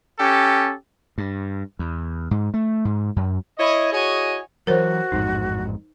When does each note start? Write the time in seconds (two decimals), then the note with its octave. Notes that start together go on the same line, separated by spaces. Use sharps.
0.19 C#4 G4 A4
1.18 G2
1.79 E2
2.31 G#2
2.54 A3
2.85 G#2
3.16 F#2
3.59 E4 C#5 D#5
3.92 E4 F#4 G#4 C#5 D#5 G#5
4.67 E3 F#3 F#4 A#4 C5 C#5
5.12 A1 F2 G#2 D#4